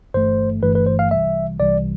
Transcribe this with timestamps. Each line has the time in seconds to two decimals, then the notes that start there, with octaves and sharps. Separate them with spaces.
0.14 G1 G2 E3 A3 C5
0.63 G1 G2 E3 A3 B4
0.75 B4
0.86 C5
0.99 F5
1.11 C2 C3 E3 G3 E5
1.60 C2 C3 E3 G3 D5